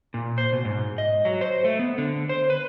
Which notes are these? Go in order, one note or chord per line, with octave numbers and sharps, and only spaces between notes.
A#2
C5
B2
G#2
D#5
F#3
C5
A3
B3
D3
C5
B4